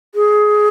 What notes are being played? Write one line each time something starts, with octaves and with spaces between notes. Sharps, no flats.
G#4